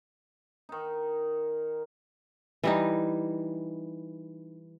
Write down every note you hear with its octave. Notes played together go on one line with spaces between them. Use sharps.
D#3 D#4
E3 G3 D#4